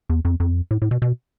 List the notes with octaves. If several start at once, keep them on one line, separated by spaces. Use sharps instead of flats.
E2
F2
F2
A2
A2
B2
B2